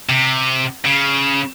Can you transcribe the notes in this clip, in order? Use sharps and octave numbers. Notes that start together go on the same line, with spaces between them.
C3
C#3